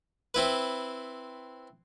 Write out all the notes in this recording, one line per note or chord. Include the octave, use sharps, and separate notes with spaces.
C4 E4 B4